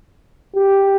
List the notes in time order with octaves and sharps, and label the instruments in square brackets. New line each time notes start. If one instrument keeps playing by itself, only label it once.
[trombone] G4